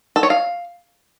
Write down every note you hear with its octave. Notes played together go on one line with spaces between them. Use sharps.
A4
C#5
F5